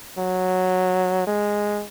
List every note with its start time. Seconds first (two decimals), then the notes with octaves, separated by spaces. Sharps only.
0.18 F#3
1.27 G#3